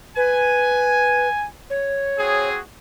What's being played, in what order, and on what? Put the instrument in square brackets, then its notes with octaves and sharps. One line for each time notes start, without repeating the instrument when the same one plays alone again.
[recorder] B4 [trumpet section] G#5
[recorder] C#5
[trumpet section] C4 F#4 G#4